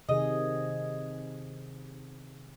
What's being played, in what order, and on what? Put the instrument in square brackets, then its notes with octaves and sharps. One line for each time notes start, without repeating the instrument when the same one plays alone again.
[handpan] C3 D#3 G#4 [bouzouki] D#5